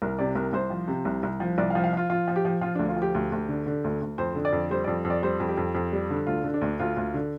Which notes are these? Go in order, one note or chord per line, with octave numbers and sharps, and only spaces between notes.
C2 A#4
C3 D5
C2 A#4
C2 C5
F3
C3
C2
C2
F3
C2 D5
F5
F3
F5
F3 F4
F3 F4
F3
G4
F3
F3 F4
D2 D4
F4
F3
G4
D2
D2
D3
D3
D2
D2
F2 C5
D3
D5
F2
G3 C5
F2 D5
F2
D5
G3 C5
F2
G4
F2
F2
G3
D3
D2 F4
D3
D4
D2
D2 F4
D2
D3